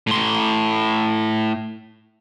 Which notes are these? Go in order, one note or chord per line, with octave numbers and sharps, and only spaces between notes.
A2 C6